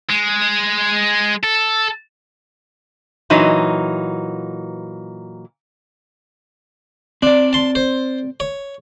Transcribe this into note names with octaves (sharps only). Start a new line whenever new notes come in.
G#3
A4
A#2 E3 F#3 D#4
C4 D4 D5
A5 C6
C5
C#5